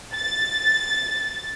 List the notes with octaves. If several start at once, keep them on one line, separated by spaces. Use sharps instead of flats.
A6